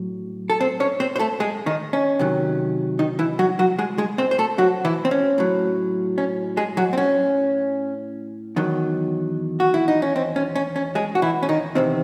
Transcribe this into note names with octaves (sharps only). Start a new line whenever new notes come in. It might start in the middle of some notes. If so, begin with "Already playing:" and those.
Already playing: A2 F#3
A4
C4 C5
C#4 C#5
C4 C5
C5
A3 A4
G#3 G#4
D#3 D#4
C#4
C3 D#3 F#3
D#3 D#4
E3 E4
F#3 F#4
F#3 F#4
G#3 G#4
G#3 G#4
C4 C5
C5
A3 A4
F#3 F#4
E3 E4
C4
C#4
A2 F#3
C#4
G#3 G#4
F#3 F#4
C4
C#4
E2 D#3 F#3
F#4
E4
D#4
C#4
C4
C#4
C#4
C#4
G#3 G#4
F#4
E3 E4
C#4
D#3 D#4
E2 C3 D#3 C4